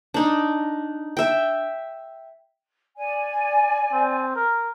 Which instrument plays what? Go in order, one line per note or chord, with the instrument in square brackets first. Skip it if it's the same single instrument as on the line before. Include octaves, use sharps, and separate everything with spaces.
[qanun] D4 D#4
E5 G5
[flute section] D5 G#5
[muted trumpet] C4
A#4